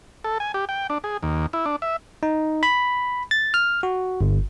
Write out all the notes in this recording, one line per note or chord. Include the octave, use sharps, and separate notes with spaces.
A4
G#5
G4
G5
D4
G#4
D#2
E4
D4
E5
D#4
B5
A6
F6
F#4
G1